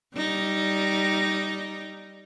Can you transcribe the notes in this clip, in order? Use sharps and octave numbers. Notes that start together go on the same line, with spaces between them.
G3 D#4